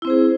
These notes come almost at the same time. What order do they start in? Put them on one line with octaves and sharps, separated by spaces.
E4 C4 C5 G#4